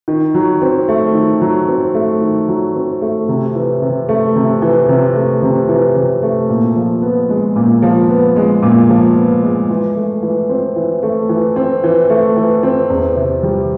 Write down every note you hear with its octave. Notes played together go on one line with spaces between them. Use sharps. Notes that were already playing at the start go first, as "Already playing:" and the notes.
D#3
F#3
C4
A3
D#3
F#3
C4
A3
D#3
F#3
C4
A3
C3
E3
C3
A3
C3
E3
C3
A3
C3
E3
C3
A3
A#2
F3
B3
G#3
A#2
F3
B3
G#3
A#2
F3
B3
G#3
E3
A3
E3
C4
E3
A3
E3
C4
E3
A3
E3
C4
E2
C3
G3